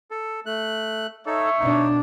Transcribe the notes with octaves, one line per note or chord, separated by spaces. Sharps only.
A4
A3 F#6
D#4 A4 C#5 E5
B2 D4 D#4